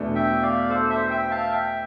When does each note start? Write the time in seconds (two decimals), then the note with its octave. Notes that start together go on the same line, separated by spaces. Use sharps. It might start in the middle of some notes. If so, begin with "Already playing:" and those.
Already playing: E2 B2 A3 D4
0.15 E5 G5
0.42 D5 F5
0.70 A4 C5
0.90 C5 E5
1.10 E5 G5
1.31 F5 A5
1.51 E5 G5